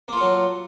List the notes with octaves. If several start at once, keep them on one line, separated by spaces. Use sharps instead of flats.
F#3 A#3 F4 A4